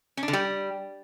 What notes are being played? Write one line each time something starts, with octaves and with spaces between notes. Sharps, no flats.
C#4
D4
D3
G3